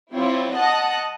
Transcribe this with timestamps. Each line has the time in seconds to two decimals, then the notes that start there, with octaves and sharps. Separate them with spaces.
0.13 F#3 C4 E4 F4 G4 C#5
0.54 D#5 F#5 A5 D#6 F#6